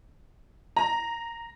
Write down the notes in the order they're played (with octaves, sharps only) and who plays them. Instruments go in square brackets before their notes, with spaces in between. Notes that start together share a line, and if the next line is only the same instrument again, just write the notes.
[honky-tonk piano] A#5